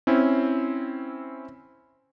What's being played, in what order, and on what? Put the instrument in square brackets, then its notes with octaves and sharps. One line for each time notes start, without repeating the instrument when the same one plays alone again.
[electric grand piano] C4 C#4 E4